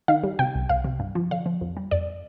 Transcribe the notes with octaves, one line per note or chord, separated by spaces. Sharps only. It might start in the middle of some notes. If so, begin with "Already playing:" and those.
D#3 F5
G3
C3 G5
C2
C2 F5
C3
G2
F3
D3 F5
F3
F2
G3
F2 D5